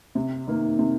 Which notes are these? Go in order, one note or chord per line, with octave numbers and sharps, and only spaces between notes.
C3
D#3 A#3
C3